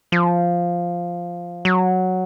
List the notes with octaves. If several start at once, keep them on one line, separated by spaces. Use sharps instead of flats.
F3
F#3